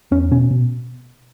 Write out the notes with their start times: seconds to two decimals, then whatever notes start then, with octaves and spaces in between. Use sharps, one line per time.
0.11 E2 C#4
0.31 B2 C#4
0.50 B2